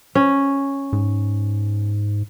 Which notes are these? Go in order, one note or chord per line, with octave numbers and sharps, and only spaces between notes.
C#4
G#2